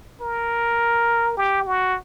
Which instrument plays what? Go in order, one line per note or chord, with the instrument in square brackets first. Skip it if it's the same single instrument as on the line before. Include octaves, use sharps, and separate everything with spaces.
[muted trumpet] A#4
G4
F#4